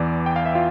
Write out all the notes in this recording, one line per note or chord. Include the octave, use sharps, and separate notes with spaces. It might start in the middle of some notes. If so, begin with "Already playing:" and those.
Already playing: E2 E3 D5 D6
G5
F5
E5
F4 F5